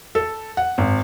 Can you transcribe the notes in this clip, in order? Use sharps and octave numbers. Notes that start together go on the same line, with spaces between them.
A4
F#5
G#1